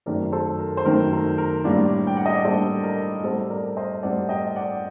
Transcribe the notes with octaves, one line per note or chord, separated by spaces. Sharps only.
F#2 D#3 A3 C4 A#4 D5
A4 C5
A#4
C5
F#2 D#3 A3 C4 A#4
A#4
A#4
A2 G3 A#3 D4
G5
F#5
D#5
D5
A2 G3 A#3 D4 A4 C5
A#4
A2 G3 C4 A4 C5
A#4 D5
C5 D#5
A2 G3 C4 D5 F#5
D#5 G5
D5 F#5